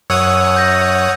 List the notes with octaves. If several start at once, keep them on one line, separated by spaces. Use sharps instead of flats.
F#2 C#5 F#5 D#6 E6
G6 A#6